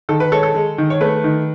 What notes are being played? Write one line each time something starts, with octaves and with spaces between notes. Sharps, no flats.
D#3 A4
B4
G#3 A4 C#5
A4
G#3
D#3
C#5
A3 B4
D#3